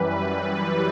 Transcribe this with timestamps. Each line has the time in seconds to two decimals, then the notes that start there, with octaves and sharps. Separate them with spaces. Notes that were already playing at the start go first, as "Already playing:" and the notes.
Already playing: F#2 E3 G3 B4
0.29 B4